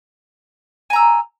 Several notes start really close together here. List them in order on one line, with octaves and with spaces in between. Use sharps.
G#5 A#5 E6